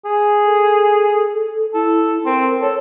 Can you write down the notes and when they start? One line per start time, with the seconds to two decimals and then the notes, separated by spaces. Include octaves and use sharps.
0.05 G#4
0.46 A4
1.74 E4 A4
2.26 C4 A#4
2.62 A4 C#5